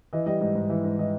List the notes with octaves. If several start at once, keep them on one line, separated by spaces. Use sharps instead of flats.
E3 D#5
G3 D#5
G#2 D#5
G#2
E3
G#2
E3 D#5